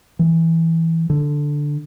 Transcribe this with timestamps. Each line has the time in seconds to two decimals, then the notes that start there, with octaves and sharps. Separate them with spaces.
0.19 E3
1.10 D3